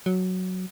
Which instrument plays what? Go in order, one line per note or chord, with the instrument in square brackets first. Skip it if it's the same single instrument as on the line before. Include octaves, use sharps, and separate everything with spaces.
[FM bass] F#3